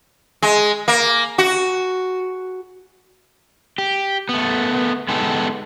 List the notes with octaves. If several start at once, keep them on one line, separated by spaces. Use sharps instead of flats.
G#3
A#3
F#4
G4
A3 B3
G#3 B3 D#4 G4 A4